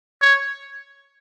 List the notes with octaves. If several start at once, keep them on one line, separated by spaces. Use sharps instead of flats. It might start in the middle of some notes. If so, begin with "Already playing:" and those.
C#5